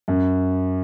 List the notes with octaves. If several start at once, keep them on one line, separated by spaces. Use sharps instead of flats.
F#2